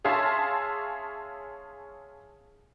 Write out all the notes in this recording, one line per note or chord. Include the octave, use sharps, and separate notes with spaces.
C#4 G#4 E5 F5 A5 C6